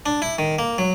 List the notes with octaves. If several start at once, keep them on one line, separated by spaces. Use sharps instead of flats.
D4
E4
D#3
A#3
F#3